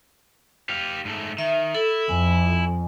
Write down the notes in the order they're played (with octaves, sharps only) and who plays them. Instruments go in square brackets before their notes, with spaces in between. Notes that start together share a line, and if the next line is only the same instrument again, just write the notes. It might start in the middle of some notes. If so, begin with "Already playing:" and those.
[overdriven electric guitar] G4 F5
G#2 A3
[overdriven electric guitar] D#3 [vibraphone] E5
[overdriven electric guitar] E4 [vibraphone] A4
[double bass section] F2 [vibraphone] G#5